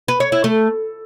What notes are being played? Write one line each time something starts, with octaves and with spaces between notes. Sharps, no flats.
B4
C#5
E4
A3